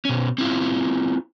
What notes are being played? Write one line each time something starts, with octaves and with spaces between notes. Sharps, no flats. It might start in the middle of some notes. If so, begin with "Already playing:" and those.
B2 C#4
C4 E4 F4